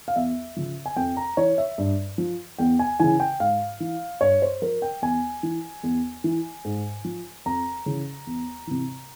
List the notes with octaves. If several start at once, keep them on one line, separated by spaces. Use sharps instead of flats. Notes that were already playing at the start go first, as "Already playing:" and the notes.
F5
E2 E5
C#3 F3
G#5
F2 G5
A#5
E3 C#5
E5
G2
F3
E2 G5
G#5
C#3 E3 G#5
G5
G#2 F5
E3
G2 C#5
C5
F3 A#4
G5
E2 G#5
E3
E2
E3
G#2
F3
F2 A#5
C#3 E3
E2
C3 E3